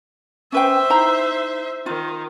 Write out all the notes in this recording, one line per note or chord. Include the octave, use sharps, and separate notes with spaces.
C#4 B4 C5 E5 G5
D#4 E4 A#5
D#3 F4